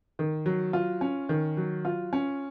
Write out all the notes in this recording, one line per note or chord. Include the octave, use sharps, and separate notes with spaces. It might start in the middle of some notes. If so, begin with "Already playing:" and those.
D#3
F#3
F4
C#4
D#3
F#3
F4
C#4